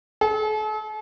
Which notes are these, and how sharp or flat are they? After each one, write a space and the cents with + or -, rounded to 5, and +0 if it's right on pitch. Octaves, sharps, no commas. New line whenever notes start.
A4 -45